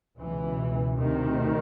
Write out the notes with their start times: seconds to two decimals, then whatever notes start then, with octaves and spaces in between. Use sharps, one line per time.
0.18 C#2 B2 E3
0.97 D2 C3 D#3